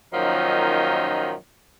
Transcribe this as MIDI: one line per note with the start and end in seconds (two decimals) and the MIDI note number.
0.13 1.33 42
0.13 1.33 46
0.13 1.33 51
0.13 1.33 53
0.13 1.33 54
0.13 1.33 63